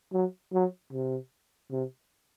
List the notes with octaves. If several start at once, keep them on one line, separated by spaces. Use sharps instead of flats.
F#3
F#3
C3
C3